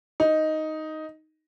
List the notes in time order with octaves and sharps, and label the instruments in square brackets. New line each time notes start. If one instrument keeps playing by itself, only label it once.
[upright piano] D#4